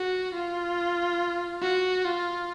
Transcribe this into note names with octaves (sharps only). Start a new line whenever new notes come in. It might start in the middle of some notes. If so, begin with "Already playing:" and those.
Already playing: F#4
F4
F#4
F4